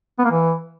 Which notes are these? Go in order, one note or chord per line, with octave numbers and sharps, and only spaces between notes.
B3
A#3
E3